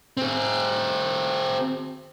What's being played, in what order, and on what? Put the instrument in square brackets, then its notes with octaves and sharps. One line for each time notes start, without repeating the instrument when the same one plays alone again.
[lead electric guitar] C4 G#4